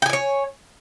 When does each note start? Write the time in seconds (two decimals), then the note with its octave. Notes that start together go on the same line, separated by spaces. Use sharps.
0.02 G5
0.06 G#5
0.09 D5
0.13 C#5